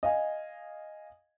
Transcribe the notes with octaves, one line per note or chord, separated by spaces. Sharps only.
D#5 F5 G#5